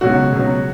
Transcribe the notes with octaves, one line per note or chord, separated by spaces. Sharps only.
C#2 B2 F#3 F#4
C#2 B2 F#3